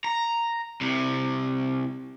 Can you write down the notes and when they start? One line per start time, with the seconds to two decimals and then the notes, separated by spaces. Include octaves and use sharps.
0.04 A#5
0.81 C2 C3